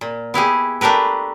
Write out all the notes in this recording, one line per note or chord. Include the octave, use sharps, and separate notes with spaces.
A#2
B3 E4 G4 G#4
A3 D4 G4 A#4 B4